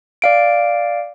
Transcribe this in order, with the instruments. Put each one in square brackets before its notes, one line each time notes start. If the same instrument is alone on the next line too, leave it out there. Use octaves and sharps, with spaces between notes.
[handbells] D5 F5 D7